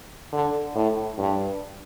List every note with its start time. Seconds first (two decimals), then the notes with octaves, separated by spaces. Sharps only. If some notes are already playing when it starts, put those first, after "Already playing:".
0.32 D3
0.75 A2
1.18 G2